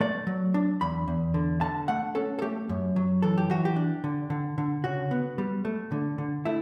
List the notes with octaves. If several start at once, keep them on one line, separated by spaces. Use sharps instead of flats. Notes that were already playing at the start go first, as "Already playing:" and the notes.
A3 D5
F#3
D4
E2 B5
E2
D3
D3 A5
A3 F#5
C#4 A4
A4
A3 G4
F#2
F#3
E3 A4
G4
E3 F#4
G4
D4
D3
D3
D3
C#3 F#4
B3
G3
A3
D3
D3
A3 E4